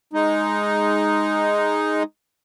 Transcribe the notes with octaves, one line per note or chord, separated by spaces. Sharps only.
G#3 D#4